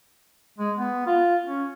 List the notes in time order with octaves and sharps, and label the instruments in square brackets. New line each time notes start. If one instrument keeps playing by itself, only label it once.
[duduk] G#3
B3
F4
C#4